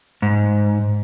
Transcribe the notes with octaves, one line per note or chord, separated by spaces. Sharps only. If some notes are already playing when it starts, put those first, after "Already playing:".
G#2